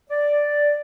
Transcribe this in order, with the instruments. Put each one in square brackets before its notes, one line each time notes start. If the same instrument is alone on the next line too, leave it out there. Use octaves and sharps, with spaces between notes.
[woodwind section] D5